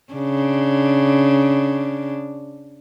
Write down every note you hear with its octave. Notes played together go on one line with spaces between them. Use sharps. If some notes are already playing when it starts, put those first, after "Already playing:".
C#3 D4